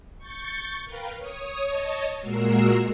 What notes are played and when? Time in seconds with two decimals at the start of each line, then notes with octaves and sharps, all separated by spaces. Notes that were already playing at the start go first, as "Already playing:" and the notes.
0.18 C#6 G6 A6 C#7
0.84 A#4 B4 F5 G5
1.18 C#5 D#6
1.67 C#5 D#5 A5
2.19 A#2 G#3 F#4 A#4 E6 C7